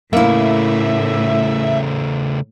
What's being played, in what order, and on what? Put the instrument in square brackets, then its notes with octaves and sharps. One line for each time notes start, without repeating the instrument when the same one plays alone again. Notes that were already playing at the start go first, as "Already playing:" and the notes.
[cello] A2 [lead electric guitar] C#3 A3 [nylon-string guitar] A#3 E4 [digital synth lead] E5